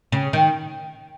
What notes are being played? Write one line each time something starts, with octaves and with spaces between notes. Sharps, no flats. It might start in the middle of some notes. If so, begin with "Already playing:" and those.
C#3
D#3